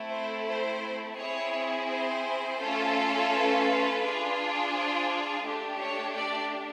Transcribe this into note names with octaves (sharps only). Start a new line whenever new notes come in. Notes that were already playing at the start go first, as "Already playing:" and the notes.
Already playing: A3 C4 E4
C5
C5
C4 E4 G#4 C#5
C5
A3 C#4 F4 A4
B4
D4 F4 G#4
C5
A3 D4 G4
C#5
D5